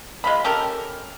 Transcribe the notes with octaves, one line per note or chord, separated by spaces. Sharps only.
G#3 F4 B5
C#4 G4 A4 A#4